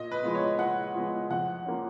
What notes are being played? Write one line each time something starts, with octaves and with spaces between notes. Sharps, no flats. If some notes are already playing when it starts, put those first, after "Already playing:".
Already playing: A#2 D#5
B4
F3 G#3 B3
C#5
A#2 F#5
F3 G#3 B3
F2 F#5
F3 A#3 C#4